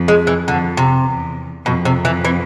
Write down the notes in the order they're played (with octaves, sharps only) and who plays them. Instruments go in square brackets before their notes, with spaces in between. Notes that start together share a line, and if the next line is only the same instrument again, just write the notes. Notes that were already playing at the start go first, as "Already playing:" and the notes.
Already playing: [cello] F2
[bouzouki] G#3
E3
[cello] F2 [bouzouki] D3
[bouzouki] C3
[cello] E2
[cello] F2 [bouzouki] B2
[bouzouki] C3
E3
E3